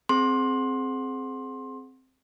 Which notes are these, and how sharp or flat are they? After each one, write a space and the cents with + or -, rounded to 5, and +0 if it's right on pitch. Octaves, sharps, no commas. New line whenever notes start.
C4 +0 G#4 +25 C6 +20